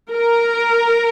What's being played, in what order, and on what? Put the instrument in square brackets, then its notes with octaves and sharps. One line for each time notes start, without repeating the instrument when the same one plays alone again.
[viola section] A#4